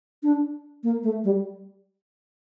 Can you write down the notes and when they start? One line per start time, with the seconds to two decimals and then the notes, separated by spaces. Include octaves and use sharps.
0.23 D4
0.83 A#3
1.03 A3
1.24 G3